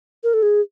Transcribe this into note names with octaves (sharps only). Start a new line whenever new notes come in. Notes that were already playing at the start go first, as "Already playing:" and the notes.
A#4
A4
G#4